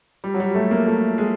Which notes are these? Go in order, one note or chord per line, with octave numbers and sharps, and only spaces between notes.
G3
F#3
G3
A3
A#3
A3
G#3